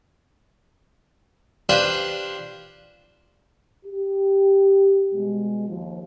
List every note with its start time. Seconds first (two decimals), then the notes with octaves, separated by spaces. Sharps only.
1.69 D4 F4 G4 B4 C5
3.85 G4
5.11 B2 G3 G#3
5.68 D#2 F3